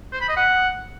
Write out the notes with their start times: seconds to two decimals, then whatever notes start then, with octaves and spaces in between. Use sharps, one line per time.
0.13 C5
0.21 B5
0.29 D#5
0.37 F#5